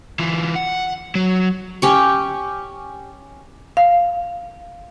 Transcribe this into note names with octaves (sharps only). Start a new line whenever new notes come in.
E3 F4
F#5
F#3
C#4 G4 C#6
F5